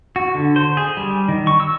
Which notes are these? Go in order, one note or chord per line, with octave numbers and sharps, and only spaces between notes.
F#4
D3
C5
G#4
G3
D#3
C#6
E6